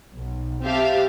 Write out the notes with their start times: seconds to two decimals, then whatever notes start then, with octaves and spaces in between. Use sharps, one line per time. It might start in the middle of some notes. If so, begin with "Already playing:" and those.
0.15 B1
0.63 C4 G4 E5 F5 A5